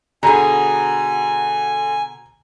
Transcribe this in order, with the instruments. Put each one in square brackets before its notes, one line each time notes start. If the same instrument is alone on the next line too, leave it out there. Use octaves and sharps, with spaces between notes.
[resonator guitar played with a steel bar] B2 G#4 [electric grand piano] D3 [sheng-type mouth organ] G#5 [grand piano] A#5